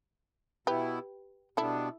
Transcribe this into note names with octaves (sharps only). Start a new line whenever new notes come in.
B2 B3 E4 G4 B4
B2 G3 B3 D4 E4 A4